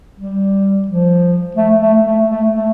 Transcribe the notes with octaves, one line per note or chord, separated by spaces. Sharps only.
G3
F3
A3
A3
A3
A3
A3